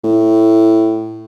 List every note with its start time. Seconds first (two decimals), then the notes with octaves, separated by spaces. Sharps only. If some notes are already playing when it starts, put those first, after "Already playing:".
0.04 A2